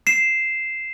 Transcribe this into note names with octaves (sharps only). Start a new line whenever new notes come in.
C7 E7